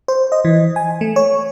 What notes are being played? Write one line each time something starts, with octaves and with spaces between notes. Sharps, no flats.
C5
D#5
E3
G#5
A3
C#5